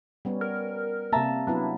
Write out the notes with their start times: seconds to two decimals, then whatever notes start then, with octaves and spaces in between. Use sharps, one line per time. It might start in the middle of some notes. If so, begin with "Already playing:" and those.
0.25 G3 B3 C#4
0.41 A#4
1.12 C3 A#3 E5 A5 A#5
1.47 F#3 B3 D4 E4